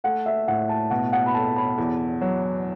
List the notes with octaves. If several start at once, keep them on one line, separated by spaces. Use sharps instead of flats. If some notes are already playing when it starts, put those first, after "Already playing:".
A3 F#5
E5
A2 F#5
A5
B2 F#5
F#5
B5
A4 A5
B5
E2
F#3